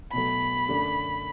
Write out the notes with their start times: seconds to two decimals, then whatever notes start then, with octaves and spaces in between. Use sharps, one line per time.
0.13 B2 F#3 A3 B5
0.69 F#2 D3 A3 D4